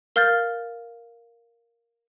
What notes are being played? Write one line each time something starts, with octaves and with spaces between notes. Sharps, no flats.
A#4 F5 F6 G6 A6